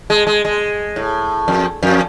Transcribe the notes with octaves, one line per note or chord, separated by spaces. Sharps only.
G#3
G#3
G#3
A2
F2
F2